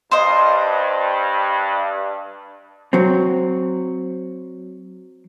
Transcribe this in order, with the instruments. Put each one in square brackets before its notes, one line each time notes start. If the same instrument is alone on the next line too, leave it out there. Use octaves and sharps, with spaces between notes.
[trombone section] G2 [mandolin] C5 D#5
[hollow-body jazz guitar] F#3 C4